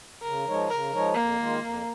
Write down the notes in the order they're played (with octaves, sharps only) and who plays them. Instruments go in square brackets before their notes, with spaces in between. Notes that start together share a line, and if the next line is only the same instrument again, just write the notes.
[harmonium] C#3 [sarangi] A#4
[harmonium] F3 G#3 D#4 C#5
[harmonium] C#3 [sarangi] A#4
[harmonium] F3 G#3 D#4 C#5
[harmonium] F2 [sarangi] A#3
[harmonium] D#3 G#3 F4
F2